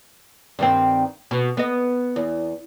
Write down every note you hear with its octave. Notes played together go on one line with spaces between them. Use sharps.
G2 D#3 C4
B2
B3 D#5
E2